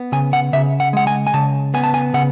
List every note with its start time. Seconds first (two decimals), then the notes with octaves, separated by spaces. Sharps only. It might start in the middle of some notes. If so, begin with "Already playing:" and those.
Already playing: B3
0.12 C#3 G#5
0.33 F#5
0.53 C#3 E5
0.80 F#5
0.93 G#3 F#5
1.07 G#5
1.27 G#5
1.34 C#3 A5
1.74 B3 G#5
1.84 A5
1.94 G#5
2.14 C#3 F#5